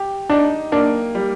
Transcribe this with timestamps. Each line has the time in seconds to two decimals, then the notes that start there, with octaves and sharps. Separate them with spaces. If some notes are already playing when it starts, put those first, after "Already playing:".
Already playing: G4
0.30 D4 D#4
0.72 A#3 D4
1.15 G3